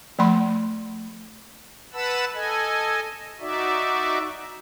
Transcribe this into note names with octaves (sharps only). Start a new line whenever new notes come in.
F3 A3 B5 C6
B4 F#5 A5 B5 E6
A4 D#5 G#5
D#4 F#4 D5 E5